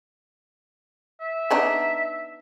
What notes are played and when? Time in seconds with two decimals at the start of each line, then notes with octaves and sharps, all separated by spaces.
1.21 E5
1.51 B3 D4 D#4